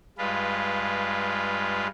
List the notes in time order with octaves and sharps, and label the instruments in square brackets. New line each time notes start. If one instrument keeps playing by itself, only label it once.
[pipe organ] G2 G#3 F4 B4